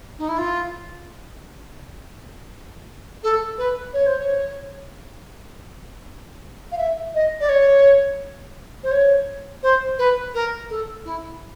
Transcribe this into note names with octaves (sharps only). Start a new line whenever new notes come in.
D#4
E4
F4
A4
B4
C#5
C5
C#5
F5
E5
D#5
D5
C#5
C5
C#5
C5
B4
A#4
A4
E4